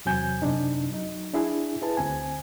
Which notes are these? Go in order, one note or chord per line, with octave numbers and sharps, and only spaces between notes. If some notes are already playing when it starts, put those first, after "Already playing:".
E2 C3 F#3 C4 G#5 G6
F#2 C3 D4 D#4
F#3 D#4
D4 E4 G#4
E4 G#4 B4 A5
D2 C4 G#5